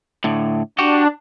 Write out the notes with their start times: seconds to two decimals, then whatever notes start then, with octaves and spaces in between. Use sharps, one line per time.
0.24 A2 D3
0.79 D4 F#4 G4